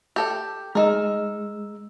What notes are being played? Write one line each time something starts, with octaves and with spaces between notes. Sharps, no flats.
G4 A4 G5
G#3 D#4 A#4 E6